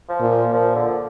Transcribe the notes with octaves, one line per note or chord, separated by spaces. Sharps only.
F3
A#2
F3
A#2 F3
D3